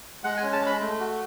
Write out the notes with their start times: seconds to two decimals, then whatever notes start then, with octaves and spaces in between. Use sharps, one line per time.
0.24 G#3 F#5
0.37 G#5
0.42 C#4
0.52 A5
0.61 G#3
0.66 B5
0.80 A3
1.00 F#4